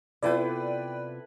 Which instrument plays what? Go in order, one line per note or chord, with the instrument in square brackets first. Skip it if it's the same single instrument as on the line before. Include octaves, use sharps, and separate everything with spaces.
[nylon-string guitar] C3 B3 F4 [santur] E4 A4 B4 [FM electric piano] D5 G5